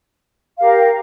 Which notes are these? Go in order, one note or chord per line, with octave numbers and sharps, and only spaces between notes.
G4 A#4 F5